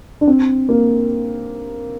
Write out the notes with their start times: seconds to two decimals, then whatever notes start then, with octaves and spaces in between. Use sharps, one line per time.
0.21 D4
0.27 C4
0.69 A#3